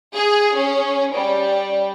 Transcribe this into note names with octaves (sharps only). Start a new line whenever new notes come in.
G#4
C#4
G3